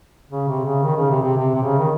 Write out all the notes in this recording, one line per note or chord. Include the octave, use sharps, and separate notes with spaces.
C#3
C3
C#3
D#3
C#3
C3
C3
C3
C3
C#3
D#3